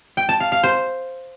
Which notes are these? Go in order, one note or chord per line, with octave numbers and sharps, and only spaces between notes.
G5
A5
F5
F5
C5